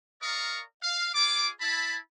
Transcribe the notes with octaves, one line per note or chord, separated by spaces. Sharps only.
A#4 D5 D#5 F5 A#5 C#6
F5
F4 G#4 D5 D6
E4 A5 B5